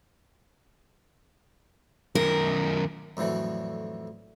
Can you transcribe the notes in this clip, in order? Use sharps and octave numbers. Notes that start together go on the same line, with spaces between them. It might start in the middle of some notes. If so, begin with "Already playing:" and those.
F#2 D#3 A#4
F2 A2 D3 E3 F#3